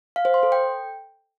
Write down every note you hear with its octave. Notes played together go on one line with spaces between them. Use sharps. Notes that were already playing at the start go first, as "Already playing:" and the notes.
F5
C5
C6
A4
G5